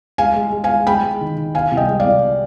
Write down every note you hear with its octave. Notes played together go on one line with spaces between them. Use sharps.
G#3 F5 G#5
G#3
G#3
F5 G#5
G#3
G#3 G5 B5
G#3
D#3
D#3
B2 F5 G#5
C2
D#5 G5
G#3
D5 F5
C2